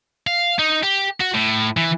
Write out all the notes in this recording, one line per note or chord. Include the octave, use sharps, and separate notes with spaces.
F5
D#4
G4
F#4
A2
E3